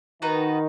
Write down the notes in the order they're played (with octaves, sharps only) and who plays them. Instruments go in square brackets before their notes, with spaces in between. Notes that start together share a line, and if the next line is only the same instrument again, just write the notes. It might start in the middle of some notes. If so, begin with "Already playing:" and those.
[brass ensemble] D#3 [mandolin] B3 D#4 F#4 B4